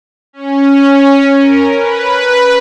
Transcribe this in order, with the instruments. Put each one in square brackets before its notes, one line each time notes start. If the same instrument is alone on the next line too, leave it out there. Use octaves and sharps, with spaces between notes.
[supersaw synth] C#4
A#4
B4